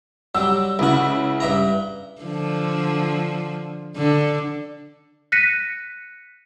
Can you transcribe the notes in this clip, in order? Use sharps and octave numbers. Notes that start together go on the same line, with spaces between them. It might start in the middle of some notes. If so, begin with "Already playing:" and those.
F#3 G3 E6
C#2 C#3 E4 F#4
G2 E5 A#5
D3 F3
D3
F#6 A#6 B6 C#7 D#7